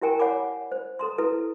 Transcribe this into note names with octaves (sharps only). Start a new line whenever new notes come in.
E4 G4 A#4 G5 G#5 A#5
C#5 F#5 G#5 B5 D6
C5
A4 A#5 C6
E4 A4 B4